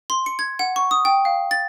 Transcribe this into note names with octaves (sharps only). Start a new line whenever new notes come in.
C6
C#7
G#6
F#5
C#6
D#6
G5
F5
A6